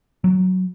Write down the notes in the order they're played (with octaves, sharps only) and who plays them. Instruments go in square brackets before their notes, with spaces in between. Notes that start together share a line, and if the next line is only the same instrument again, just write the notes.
[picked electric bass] F#3